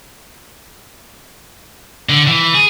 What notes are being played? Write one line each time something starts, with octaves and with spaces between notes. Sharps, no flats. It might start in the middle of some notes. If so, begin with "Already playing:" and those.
D3
E3
G#4